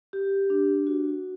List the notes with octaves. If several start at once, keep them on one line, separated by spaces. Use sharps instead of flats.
G4
D4
F#4